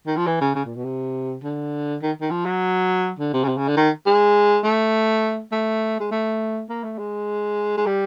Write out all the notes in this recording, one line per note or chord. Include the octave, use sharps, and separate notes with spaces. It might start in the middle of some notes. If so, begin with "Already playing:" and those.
D#3
F3
E3
C#3
C#3
A#2
B2
C3
D3
D#3
D#3
F3
F#3
D3
C3
C#3
C3
C#3
D3
D#3
G#3
A3
A3
G#3
A3
A#3
A3
G#3
G#3
G3